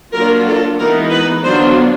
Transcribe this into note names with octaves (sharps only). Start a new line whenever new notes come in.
F#3 A#3 D4 F4 A#4
A4
E3 G#3 B3 D#4 A#4
B4
D3 F#3 B3 D4 F4 C5